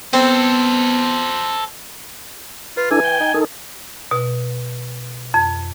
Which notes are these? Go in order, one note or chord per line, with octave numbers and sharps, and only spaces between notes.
B3 C4 A4 C5
F4 B4
E3 D4 E4 A4 G#5
G5
D#4
D#3 D#4 A4
B2
F2